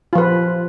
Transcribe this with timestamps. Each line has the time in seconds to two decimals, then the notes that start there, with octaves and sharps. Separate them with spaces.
0.13 F4
0.15 F3
0.18 B4